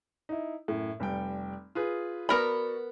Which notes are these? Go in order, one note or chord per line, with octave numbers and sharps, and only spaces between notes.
D#4 E4
F#2 A2
F1 G3 G5
F4 G#4 B4
B3 F#4 A#4 D5 B5